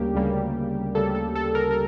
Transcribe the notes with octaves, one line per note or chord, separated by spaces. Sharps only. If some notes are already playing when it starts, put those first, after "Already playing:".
Already playing: D2 C#3 G3 A#3 G4
D2 C#3 G3 A#3
D2 C#3 G3 A#3 A4
A4
A4
A#4
A#4